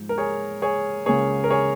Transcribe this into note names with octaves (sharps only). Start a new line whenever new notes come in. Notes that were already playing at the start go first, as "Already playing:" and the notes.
Already playing: G#2 F3
A#4
G#4 C#5
G#4 C#5
C#2 C#3 A#3 G#4 C#5
A#4
G#4 C#5